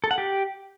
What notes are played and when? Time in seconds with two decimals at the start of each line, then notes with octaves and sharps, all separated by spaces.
0.04 A4
0.11 F#5
0.18 G4